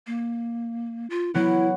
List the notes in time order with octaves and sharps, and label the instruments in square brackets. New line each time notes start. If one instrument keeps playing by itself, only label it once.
[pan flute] A#3
F4
[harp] F#3 B3 [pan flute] E4